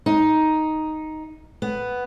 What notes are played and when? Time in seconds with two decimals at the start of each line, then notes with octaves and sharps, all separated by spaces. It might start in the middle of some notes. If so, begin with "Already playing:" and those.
0.06 D#4
1.62 B3